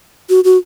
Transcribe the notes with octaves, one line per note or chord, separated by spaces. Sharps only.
F#4
F#4